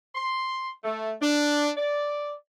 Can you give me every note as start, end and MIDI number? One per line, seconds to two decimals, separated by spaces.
0.15 0.71 84
0.84 1.12 57
1.21 1.70 62
1.77 2.34 74